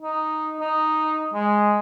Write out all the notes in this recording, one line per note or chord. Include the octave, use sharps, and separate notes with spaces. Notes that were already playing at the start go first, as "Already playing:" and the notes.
D#4
D#4
G#3